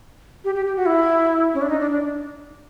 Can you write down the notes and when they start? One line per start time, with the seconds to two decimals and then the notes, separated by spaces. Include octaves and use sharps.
0.44 G4
0.55 G4
0.66 G4
0.77 F#4
0.86 E4
1.54 C#4
1.62 D4
1.69 D#4
1.80 D4
1.91 D4